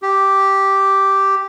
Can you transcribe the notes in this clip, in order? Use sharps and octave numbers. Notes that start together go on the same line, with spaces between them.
G4